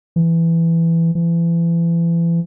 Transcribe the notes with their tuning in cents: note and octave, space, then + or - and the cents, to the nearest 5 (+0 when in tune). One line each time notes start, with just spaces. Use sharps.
E3 +10
E3 +35